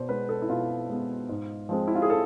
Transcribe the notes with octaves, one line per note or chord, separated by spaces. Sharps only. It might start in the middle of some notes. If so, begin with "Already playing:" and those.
Already playing: B2 C5 D5
G#3 B3 B4
A4
E4
B2 F4
G#3 B3
G#2
F3 G#3 C4
E4
F4
G#4
A4